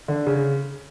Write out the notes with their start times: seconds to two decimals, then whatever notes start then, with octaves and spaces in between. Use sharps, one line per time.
0.08 D3
0.27 C#3